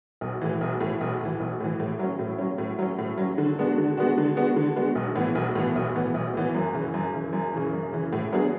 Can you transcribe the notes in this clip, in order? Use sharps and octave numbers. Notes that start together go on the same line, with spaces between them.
B1
A2 E3
B1
A2 E3
B1
A2 E3
B1
A2 E3
A2
F#3 C#4
A2
F#3 C#4
A2
F#3 C#4
A2
F#3 C#4
D3
G#3 B3 D4 F#4
D3
G#3 B3 D4 F#4
D3
G#3 B3 D4 F#4
D3
G#3 B3 D4 F#4
B1
A2 E3 B3
B1
A2 E3 B3
B1
A2 E3 B3
B1
A2 E3 B3
F#2
C#3 E3
F#2
C#3 E3
F#2
C#3 E3
F#2
C#3 E3
A2
F#3 B3 D4 G#4